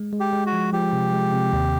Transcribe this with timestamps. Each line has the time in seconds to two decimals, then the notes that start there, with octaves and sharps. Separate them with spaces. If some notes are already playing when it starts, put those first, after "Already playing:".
Already playing: G#3
0.13 G#3
0.20 G4
0.33 G#3
0.46 F#4
0.53 F3
0.73 F3 G4
0.93 C3
1.13 G#3
1.33 C3
1.53 D#2